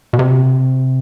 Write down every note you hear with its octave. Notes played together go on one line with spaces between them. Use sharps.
B2
C3